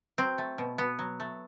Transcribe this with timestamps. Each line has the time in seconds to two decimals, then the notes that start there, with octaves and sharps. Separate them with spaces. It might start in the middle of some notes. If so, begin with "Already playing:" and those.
0.18 F#3 C4
0.38 A3
0.58 B2
0.78 B2 B3
0.99 F#3
1.20 A3